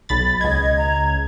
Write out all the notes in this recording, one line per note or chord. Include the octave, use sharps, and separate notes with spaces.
B1 B5 A6
C#2 D#5 G#6
A#5